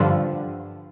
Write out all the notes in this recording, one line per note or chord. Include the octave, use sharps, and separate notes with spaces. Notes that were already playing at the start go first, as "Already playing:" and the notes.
Already playing: G2 D3 F3